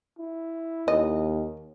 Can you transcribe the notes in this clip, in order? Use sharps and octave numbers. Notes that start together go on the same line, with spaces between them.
E4
D#2 D#5